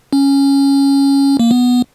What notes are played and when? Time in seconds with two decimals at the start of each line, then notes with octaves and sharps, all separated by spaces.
0.13 C#4
1.39 A#3
1.51 B3